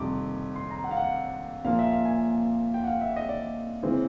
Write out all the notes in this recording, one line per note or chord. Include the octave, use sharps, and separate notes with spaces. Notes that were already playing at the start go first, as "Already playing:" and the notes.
Already playing: F2 C3 D#3 G3 D6
C6
A#5
F#5
F5
F#5
A#2 F3 A#3 F5
E5
F5
G#5
G5
F#5
F5
E5
D#5
D5
C#3 E3 G#3 C4